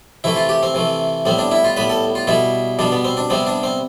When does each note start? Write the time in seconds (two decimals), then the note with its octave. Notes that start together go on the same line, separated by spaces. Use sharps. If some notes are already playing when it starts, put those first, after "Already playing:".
0.24 C3 E3 A3 E4
0.36 F4
0.49 G4
0.63 C4
0.75 C3 E3 A3
1.25 A2 G3 B3 C4
1.38 D4
1.51 E4
1.64 F4
1.77 A2 G3 B3 B4
1.90 A4
2.15 F4
2.27 B2 G3 B3 E4
2.79 B2 G3 B3 D4
2.92 B3
3.05 C4
3.17 D4
3.30 C3 G3 B3 C4
3.47 D4
3.63 C4